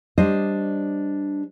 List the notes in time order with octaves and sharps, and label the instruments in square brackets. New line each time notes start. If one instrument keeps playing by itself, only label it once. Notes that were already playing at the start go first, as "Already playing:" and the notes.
[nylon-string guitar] G3 D4 C5 D#5